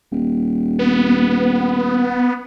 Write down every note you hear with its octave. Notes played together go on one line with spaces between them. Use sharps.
D#1
B3